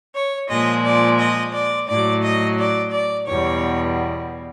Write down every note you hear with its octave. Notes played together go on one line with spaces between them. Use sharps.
C#5
A#2 F3 G#3 D#5
D5
D#5
D5
A2 F#3 D5
D#5
D5
D5
E2 B2 G3 C#5